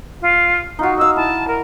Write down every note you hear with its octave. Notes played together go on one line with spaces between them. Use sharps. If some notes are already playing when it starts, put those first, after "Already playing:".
F4
D#4 F4 F#4
D#5 F5 E6
E4 A5
A#4